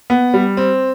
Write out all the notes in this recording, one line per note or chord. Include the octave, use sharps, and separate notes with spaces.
B3
G3
C4